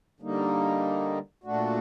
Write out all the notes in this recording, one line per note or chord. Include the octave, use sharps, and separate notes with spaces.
D3 G3 A#3 D#4
A#2 A3 D4 F#4